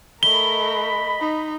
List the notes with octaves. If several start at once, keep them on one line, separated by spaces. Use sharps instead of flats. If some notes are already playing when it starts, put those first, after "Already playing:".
A3 A#4 D#5 B5 G7
D#4